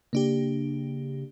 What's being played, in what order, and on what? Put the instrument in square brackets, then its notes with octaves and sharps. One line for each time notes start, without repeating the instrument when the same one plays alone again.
[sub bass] C#3 [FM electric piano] A#3 D4 G4